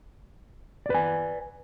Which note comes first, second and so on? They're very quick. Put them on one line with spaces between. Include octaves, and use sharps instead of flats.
D5 B4 G#5